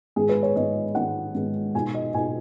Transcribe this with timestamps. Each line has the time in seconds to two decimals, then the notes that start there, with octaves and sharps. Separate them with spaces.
0.16 G#2 D#3 G#3 B3 G#4
0.29 B4
0.43 C#5
0.56 G#2 D#3 G#3 B3 D#5
0.95 G#2 D#3 G#3 B3 F#5
1.34 G#2 D#3 G#3 B3
1.75 B2 B3 D#4 G#5
1.94 D#5
2.14 B2 B3 D#4 G#5